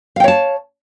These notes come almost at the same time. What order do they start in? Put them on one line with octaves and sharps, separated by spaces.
F5 G5 C#5 A5